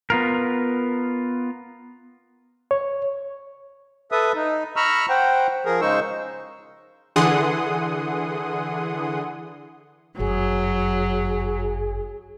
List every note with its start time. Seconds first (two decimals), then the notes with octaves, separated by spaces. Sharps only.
0.10 B3 F4 A#4
2.71 C#5
4.12 A4 B4 E5 D#6
4.36 D#4
4.76 A#5 B5 C#6 E6 F6
5.09 C5 F#5 G5
5.65 F3 G#4 A#4
5.81 C#3 G#3 D#4 C5 C#6 E6
7.16 D3 E3 G#4 F#5 C6 D#6
10.19 G1 F#2 F#3 G#4